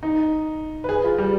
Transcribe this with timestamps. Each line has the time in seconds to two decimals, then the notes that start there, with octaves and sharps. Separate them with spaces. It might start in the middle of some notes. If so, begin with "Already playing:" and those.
0.03 D#4
0.84 B4
0.89 G#4
1.04 F4
1.18 G3